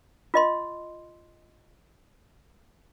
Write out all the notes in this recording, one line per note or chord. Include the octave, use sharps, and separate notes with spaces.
F4 D#5 C6